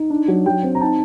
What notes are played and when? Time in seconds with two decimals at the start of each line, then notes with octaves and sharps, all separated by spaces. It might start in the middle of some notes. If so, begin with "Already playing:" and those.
Already playing: D#4
0.10 D4
0.28 F#3
0.46 F#3 G5
0.63 C4
0.75 A#5
0.81 D#4 A5